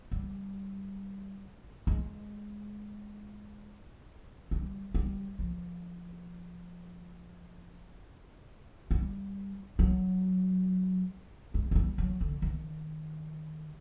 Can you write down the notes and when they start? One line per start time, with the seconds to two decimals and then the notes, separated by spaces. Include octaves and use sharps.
0.11 G3
1.87 G#3
4.51 G3
4.94 G3
5.39 F3
8.91 G3
9.79 F#3
11.54 G#3
11.71 G#3
11.75 G3
11.98 F#3
12.21 D3
12.42 D#3